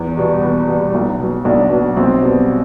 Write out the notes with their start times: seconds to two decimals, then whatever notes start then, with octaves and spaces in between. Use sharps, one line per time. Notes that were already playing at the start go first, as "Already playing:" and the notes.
Already playing: E2
0.17 B2 G3
0.42 E2 B4
0.68 B2 G3
0.94 B1
1.19 B2 F#3
1.45 B1 D4
1.71 B2 F#3
1.97 B1 C4
2.22 B2 G3